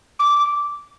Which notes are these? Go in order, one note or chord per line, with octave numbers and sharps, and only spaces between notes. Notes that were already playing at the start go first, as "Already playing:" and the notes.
D6